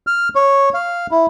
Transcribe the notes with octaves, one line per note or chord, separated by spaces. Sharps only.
F6
C#5
F5
E4